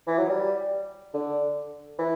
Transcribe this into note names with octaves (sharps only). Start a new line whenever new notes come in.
E3
F#3
G3
D3
E3